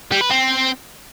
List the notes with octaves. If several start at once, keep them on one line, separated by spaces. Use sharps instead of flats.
G3
B4
C4